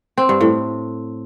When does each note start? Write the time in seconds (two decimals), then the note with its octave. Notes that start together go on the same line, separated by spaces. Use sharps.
0.17 C4
0.29 G2
0.41 A2